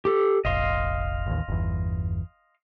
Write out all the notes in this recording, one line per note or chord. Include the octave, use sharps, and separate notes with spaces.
G4 A4
F1 A#1 D#5 F5 C6
A1 D#2
G1 E2